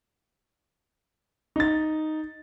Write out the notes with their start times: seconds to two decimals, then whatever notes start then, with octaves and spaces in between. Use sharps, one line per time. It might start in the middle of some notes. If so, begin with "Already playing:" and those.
1.56 D#4 A6